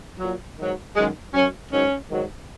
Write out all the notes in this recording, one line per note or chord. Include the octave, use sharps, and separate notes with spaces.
A#2 F#3
G#2 D#3 F#3
F#2 D#3 F#3 G#3
F#2 F#3 C#4
G#2 D#3 F#3 C#4
G#2 D#3 F#3